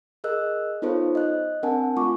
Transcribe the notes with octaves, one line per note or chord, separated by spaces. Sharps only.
G#4 A#4 D#5 E6 F#6
B3 D#4 F4 A4 C5 C#5
D#5 F#6
C4 D4 A#4 F#5 G#5 A5
A3 F4 C#6 D6